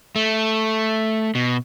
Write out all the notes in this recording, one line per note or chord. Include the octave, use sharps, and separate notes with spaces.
A3
B2